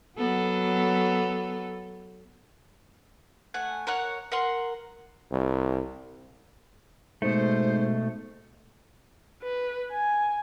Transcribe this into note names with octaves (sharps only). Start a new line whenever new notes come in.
F#3 B3 A4
A3 F#5 G#5
A#4 C#5 F#5
A#4 F#5 C6
C2
G#2 B2 A3 C5
B4
G#5